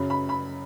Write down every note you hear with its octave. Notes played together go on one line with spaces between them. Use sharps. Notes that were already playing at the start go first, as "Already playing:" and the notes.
Already playing: F#2 C#3 F#3 B5
B5
B5